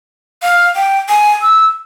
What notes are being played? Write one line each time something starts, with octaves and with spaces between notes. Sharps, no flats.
F5
G5
G#5
E6